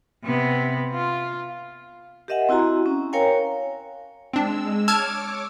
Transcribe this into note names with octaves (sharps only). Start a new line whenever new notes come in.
C3 B3
F4
G4 A#4 D#5 E5 F#5 G#5
C4 E4 F#4 G#5 A#5
C#4
A#4 C#5 F5 G5 G#5 A#5
G#3 C4 D4 E6
C#5 A5 D6 E6 F6 G#6